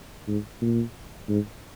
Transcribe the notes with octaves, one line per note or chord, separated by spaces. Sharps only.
G#2
A#2
G#2